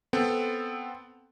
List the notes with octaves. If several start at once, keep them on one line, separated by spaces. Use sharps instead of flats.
B3 C4 A4